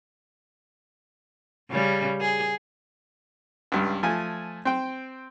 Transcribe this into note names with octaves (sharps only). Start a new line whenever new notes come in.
C#3 G3
G#4
C#2 G2
F3 A3 G#5
C4 G5